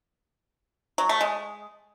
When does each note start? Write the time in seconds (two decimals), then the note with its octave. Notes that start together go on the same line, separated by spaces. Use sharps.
0.98 F#3
1.09 A3
1.21 G#3